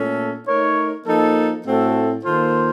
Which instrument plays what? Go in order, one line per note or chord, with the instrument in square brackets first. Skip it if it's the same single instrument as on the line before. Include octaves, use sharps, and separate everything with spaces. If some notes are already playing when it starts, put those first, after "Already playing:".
Already playing: [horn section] A#2 A3 C#4 A4
A3 D#4 A#4 C#5
F3 A#3 D#4 A4
A2 A3 C4 F#4 A4
D#3 A#3 F4 A4 C5